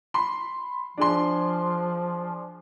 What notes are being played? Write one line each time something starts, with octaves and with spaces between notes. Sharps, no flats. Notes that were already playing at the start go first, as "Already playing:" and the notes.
B5 C6
F3 D4 G#4 C6